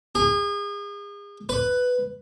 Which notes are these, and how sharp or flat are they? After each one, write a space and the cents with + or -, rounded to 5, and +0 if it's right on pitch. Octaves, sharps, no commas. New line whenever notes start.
G#4 -35
B4 +5